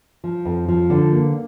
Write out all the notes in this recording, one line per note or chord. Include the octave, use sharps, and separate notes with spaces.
F3
F2
F3
D3
A#3